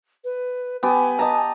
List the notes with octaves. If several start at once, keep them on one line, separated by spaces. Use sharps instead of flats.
B4
B3 G4 G#5
D#5 A5 A#5